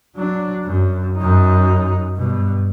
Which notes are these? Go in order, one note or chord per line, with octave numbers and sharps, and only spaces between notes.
F#3 D4
F#2
F#2 D#4
G2 B2